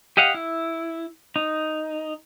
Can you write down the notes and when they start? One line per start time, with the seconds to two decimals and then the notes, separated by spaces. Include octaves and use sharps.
0.17 G4 D#5 F5 F#5
0.34 E4
1.36 D#4